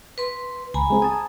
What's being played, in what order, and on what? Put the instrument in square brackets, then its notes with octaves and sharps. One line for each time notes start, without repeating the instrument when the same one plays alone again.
[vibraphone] B4 C6
[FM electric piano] C#2 [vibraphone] G#5 A#5 B5
[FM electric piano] G#3 C4 G#4
[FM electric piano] G#5 A5 [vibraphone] D#6